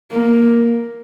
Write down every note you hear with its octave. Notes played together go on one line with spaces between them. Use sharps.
A#3